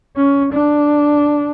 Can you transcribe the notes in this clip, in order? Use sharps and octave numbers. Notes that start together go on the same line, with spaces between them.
C#4
D4